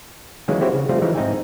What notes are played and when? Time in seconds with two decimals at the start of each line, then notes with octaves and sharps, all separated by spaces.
0.48 D#3 E3 F#3 G#3 A#3 C#4
0.60 C4 E4 F#4 G4 C5 C#5
0.74 C#3
0.89 F3 G3 A3 C4 F4
1.02 E3 F3 G#3 D#4 C#5
1.15 G#2 C4 D#4 E5 G5 G#5